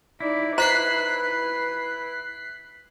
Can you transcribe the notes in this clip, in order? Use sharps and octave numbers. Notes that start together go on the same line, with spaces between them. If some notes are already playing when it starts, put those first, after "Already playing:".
D#4 E4 D5
B4 C5 D#5 A#5 F#6 B6 C7